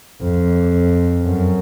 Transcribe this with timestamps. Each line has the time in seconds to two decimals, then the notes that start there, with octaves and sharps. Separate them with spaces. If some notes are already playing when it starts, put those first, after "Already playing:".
0.22 F2
1.24 F#2